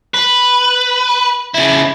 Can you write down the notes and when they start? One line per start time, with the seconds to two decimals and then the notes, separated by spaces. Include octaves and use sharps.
0.14 B4
1.54 C#3 E4